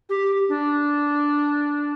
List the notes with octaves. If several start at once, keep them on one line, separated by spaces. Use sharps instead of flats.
G4
D4